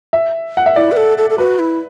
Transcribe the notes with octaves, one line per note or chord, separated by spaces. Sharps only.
E5
F#5
E5
E4 D5
B4
A4
A4
A4
F#4 B4
E4